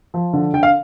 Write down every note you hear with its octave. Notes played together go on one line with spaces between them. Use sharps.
F3
D3
D3 G5
F5